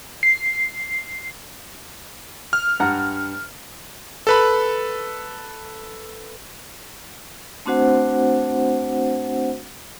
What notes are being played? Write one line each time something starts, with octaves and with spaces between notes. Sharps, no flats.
C7
F6
G2 F#5 A#5
A4 B4 B5
A3 C4 D4 F#4 C5 F#5